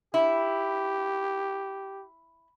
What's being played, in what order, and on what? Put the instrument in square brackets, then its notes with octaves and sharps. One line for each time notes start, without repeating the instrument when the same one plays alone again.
[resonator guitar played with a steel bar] E4 [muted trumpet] G4